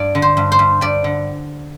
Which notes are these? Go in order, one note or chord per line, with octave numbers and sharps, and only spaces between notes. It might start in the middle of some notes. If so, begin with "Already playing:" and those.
Already playing: G2 D5
D3
C5
G2
C5
G2
G2 D5
D3